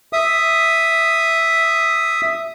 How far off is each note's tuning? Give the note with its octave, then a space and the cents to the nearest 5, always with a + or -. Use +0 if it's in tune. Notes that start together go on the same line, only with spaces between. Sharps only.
E5 +0 D#6 +0